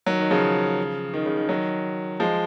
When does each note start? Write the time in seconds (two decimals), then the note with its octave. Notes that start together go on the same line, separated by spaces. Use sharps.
0.06 D#3 F#3
0.19 D#3
0.31 C#3 F3
1.14 D#3
1.26 C#3
1.37 D#3
1.49 D#3 F#3
2.20 F3 G#3